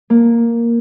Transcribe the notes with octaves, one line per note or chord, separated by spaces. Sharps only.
A#3